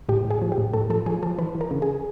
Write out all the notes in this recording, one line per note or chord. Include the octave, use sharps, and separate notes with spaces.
A2 G4
A2
G#4
F3
G4
A2
A2 A4
F3 A4
F3 G#4
F3 A4
E3 B4
E3
A#4
C#3
G#4